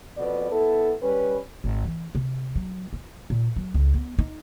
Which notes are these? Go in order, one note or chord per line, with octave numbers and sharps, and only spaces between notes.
F2 B2 B4 D5
B3 E4 A4
G3 C#4 B4
G#1
E3
C3
F#3
F4
A#2
F#3
C#2
B3
D#4